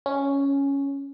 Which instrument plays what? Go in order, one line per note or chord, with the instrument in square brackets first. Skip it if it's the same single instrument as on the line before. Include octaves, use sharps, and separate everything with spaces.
[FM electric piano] C#4